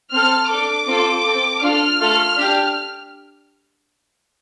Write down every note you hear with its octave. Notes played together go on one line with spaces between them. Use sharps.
C4 A4 F6
D4 A4 D6
C4 F4 A4
C4 A4
D4 F4 A4 F6
A3 F4 A4
D4 G4